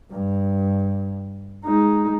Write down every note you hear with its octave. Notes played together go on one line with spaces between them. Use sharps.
G2
G#3 D#4